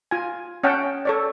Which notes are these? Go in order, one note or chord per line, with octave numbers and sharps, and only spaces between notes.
F4 G#5
C#4 C#5 F#5 G5 A5
A4 C#5 D5